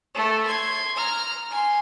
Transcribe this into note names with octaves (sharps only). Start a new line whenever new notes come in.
A3 A4
C6 G#6
A#5 F6
G#5 C6